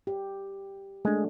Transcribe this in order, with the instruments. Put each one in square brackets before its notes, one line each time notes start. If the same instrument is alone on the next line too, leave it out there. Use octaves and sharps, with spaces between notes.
[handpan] G4
[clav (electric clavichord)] G#3 [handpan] A3 D4